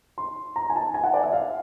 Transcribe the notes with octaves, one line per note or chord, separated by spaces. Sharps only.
C6
A#5
G#5
A5
G#5
F#5
D5
E5
F5